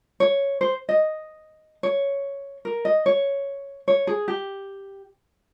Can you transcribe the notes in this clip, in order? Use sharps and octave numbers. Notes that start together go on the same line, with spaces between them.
C#5
C5
D#5
C#5
A#4
D#5
C#5
C#5
G#4
G4